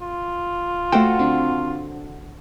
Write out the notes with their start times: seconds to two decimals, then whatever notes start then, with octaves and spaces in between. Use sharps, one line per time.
0.02 F4
0.92 A3 F#4 A4 C5 G5
1.19 D3 C4 D4